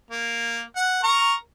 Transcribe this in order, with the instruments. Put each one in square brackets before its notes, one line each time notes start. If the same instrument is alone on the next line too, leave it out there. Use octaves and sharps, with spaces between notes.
[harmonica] A#3
F#5
A#4 A#5 C#6